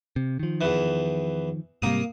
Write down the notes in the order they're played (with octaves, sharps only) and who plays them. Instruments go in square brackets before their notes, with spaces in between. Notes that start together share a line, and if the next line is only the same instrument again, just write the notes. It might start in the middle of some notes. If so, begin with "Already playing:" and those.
[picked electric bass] C3
D#3 F3
[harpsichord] E2 E3
[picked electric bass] G#2 C3 G3 [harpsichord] A#3 D#6